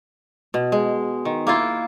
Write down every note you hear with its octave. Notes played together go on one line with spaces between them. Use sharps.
B2
G#3
D#3
A#3 E4 F4